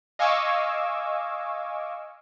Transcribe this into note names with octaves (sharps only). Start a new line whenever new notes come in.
D#5 F5 G#5 C#6 D6 E6